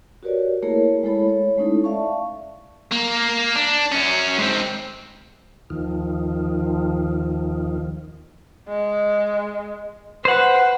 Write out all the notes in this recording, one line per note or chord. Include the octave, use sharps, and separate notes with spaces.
F#4 G4 A#4 B4 C#5 D5
A3 A#3 E4 G#4 A#4 C#5
G#3 A3 E4 A4 C#5 B5
C#5
G#3 A3 C#4 D#4 E4 A4
D5 E5 F5 A5 C#6
A#3
D4
F#2 C#4
G#2 C4
D#2 D#3 F3
G#3
B4 C5 F#5